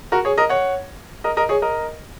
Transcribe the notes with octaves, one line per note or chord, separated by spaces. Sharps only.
F#4 A#4
G#4 C#5
A#4 D#5
C#5 F#5
A#4 D#5
A#4 D#5
G#4 C#5
A#4 D#5